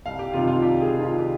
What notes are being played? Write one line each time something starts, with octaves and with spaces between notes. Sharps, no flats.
C2 F5
G4
C3 D#3 F4
F4
C2 G4
G#4
C3 D#3
F4
G4